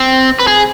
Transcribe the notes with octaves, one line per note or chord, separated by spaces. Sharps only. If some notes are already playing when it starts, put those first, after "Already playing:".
Already playing: C4
B4
G#4